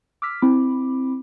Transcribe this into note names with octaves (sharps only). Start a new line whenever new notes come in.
D6 E6 F6 B6
C4 E4 B5 D6